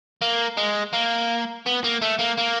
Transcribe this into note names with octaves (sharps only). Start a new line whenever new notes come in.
A#3
G#3
A#3
B3
A#3
A3
A#3
A#3